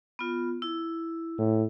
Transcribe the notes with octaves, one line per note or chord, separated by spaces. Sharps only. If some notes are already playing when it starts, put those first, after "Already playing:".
B3 F4
E4
A2